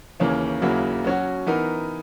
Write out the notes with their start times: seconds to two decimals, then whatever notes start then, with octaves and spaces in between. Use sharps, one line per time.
0.20 D#2 C#3 E3 A#3 C#4
0.62 D#2 C#3 F#3 A#3 E4
1.04 F#3 C#4 F#4
1.46 E3 B3 D#4 A#4